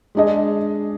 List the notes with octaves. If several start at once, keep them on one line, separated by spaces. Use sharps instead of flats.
G#3 D4 G#4 D#5